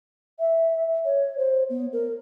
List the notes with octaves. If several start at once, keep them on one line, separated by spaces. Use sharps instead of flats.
E5
C#5
C5
B3
A#4